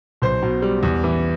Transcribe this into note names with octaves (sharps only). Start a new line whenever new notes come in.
B1 C5
B2
G3
E2
E3